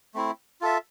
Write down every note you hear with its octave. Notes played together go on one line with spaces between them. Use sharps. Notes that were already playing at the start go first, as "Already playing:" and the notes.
A3 C4 E4
F4 A4 E5